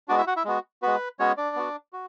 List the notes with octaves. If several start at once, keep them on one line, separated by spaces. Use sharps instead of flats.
G#3 B3 D4 F#4 D5
E4 E5
F#4 F#5
E4 E5
G#3 B3 F#4
G#3 B3 F#4 B4
G#3 B3 C#4 F#4 C#5
D4 D5
B3 F#4
F#4